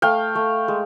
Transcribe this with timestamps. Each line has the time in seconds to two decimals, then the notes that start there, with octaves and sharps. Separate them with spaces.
0.02 A3 F5 G5
0.35 A3
0.68 G#3